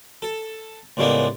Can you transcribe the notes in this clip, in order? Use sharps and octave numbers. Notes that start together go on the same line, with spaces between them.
A4
C#2 A2 G3 G#3 A#3 B3